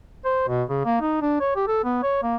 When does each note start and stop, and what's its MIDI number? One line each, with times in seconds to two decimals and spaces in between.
0.25 0.43 72
0.48 0.63 47
0.69 0.80 49
0.85 0.99 58
1.01 1.18 63
1.22 1.38 62
1.40 1.55 73
1.56 1.64 67
1.67 1.81 69
1.84 1.99 59
2.03 2.22 73
2.23 2.36 58